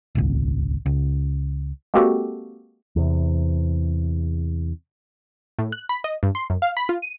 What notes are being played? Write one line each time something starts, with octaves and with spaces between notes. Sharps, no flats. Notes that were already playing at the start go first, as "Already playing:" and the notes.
D#1 G#1 C#2
C#2
G#3 A#3 C4 F#4 G4 A4
E2 C3
A2
F#6
B5
D#5
G2
C6
F#2
F5
B5
F4
D#7